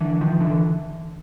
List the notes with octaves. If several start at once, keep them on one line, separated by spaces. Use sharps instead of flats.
D3 E3
D#3 F3
D3 E3